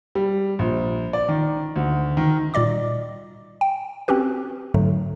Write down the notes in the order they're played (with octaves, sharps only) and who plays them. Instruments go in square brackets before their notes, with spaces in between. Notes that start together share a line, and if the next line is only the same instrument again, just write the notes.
[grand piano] G3
A#1
D5
D#3
D2
D#3
[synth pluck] A#2 G3 D5 D#5 D6
G5
C4 C#4 F#4 G4 B4
G#2 D3 F#3 A3